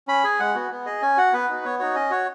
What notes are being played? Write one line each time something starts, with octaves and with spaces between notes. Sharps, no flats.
C#4 B5
G#4 G#5
G#3 F#5
B3 F#4
B3
G#4 D#5
C#4 G#5
F#4 F#5
B3 B4
D#4 F#4
B3 C#5
D#4 F#4 C#5
C#4 D#5
F#4 C#5